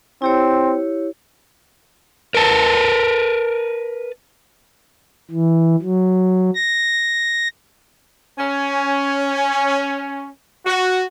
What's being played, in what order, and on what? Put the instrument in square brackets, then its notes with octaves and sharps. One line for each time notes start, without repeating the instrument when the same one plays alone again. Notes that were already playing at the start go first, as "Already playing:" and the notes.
[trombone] C4 [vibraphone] E4 G4 C#5
[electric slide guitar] A#4 B4 A5
[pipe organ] E3
F#3
A#6
[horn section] C#4
F#4